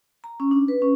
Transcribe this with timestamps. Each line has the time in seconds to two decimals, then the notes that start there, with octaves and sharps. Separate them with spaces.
0.24 A#5
0.40 C#4
0.51 D4
0.68 B4
0.82 C#4